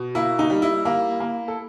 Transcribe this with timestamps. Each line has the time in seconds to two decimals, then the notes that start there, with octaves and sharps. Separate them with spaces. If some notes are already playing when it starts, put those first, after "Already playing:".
Already playing: B2
0.15 A#3 E4
0.39 D#4
0.50 G3
0.62 E4
0.85 A#3
1.20 A#3
1.48 A4